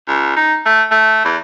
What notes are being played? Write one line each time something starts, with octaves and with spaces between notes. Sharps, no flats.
C#2
D#4
A3
A3
E2